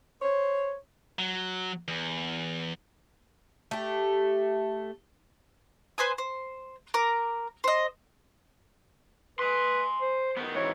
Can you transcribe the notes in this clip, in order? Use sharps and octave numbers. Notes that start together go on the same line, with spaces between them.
C5 C#5
F#3
E2
A3 G4
B4 C5 G#5 D#6
C5
A#4 D6
C5 D#5
B4 G#5 C6
C5
D#3 B3
G#2 E3 C#5